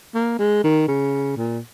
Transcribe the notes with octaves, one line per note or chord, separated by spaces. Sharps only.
A#3
G#3
D#3
C#3
A#2